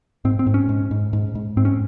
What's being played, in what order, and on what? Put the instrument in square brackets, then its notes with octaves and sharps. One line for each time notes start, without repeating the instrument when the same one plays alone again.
[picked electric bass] G#2 C4
C4
G#2
C#4
G#2
G#2
G#2
G#2
G#2 C4
C#4